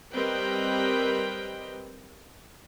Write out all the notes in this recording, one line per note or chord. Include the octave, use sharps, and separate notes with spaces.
G3 C4 A#4 B4 D#5 G5